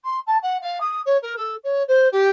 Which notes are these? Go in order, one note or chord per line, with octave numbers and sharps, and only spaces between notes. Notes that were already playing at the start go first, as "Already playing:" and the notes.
C6
A5
F#5
F5
D#6
C#5
A#4
A4
C#5
C5
G4